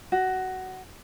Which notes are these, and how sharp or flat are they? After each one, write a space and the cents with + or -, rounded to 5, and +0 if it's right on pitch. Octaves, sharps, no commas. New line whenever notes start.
F#4 +15